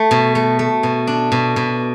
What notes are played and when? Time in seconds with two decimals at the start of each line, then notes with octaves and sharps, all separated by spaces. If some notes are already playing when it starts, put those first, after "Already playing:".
Already playing: A3
0.11 B2
0.35 A3
0.59 A3
0.83 B2
1.07 D4
1.32 B2
1.56 B2